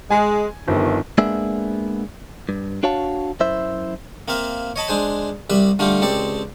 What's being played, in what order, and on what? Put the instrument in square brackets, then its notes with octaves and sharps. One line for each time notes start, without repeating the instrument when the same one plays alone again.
[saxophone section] G#3 [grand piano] G#5
[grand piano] G1 [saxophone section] F2 C3 D#3
[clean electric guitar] G#3 A#3 B3 D4 G#4 E5
G2
D4 F#4 C#5 F5 A5
F#2 E4 C5 E5
[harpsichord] A#3 C4 E5 F5
C#5 D#5 A5 B5
G#3 D4 G#4 C5
C2 G3 B4 E5 B5
D3 G3 A3 F4 G4
C#2 C4 G4 A4 D5